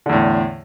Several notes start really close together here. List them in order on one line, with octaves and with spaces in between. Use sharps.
D3 E2 A2